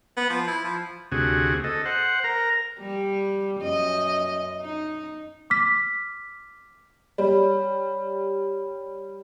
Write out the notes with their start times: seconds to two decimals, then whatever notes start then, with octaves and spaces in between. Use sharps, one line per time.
0.17 B3
0.30 F3
0.48 E4
0.64 F3
1.12 D2 C3 F#4 G#4
1.64 A4 D#5
1.85 C5 F#5
2.24 A#4 A#5
2.80 G3
3.61 F#2 D#5
4.62 D#4
5.50 D6 F6 B6
7.18 G3 C#5 B5